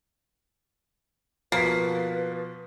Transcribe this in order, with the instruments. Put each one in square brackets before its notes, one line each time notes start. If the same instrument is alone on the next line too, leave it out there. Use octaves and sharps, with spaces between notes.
[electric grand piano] B2 F3 [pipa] A#3 [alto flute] B4 [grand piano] B6 C7